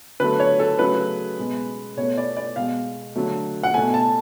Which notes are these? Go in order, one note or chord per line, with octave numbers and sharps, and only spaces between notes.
D3 F#3 A3 B4
C#5
A4
C#3 F#3 A3 B4
B2 G#3
B2 A3 C#5
D5
D5
B2 G#3 F5
D3 F#3 A3
F#5
B2 A3 G#5
A5